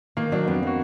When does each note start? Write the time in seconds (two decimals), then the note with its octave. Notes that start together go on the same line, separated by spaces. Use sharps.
0.17 D#3 A#3
0.32 F#3 D4
0.47 F2 B3
0.63 D#3 F#4